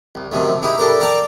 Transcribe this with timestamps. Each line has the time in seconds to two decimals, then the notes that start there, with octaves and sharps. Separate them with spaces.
0.15 C2
0.32 F#2 C3 D#3 A3
0.62 G#3 D#4 E4 G4
0.78 G3 D4 A4 A#4 A#5
1.00 A#4 D5 F5 G5 A5 A#5